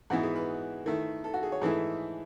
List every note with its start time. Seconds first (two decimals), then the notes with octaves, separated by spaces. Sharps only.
0.10 G#2 E3 B3 E4 F#4
0.23 G#4
0.36 B4
0.86 D#3 A3 E4
1.24 A4
1.34 F#4
1.43 G#4
1.52 C#5
1.62 G#2 E3 A3 E4 G#4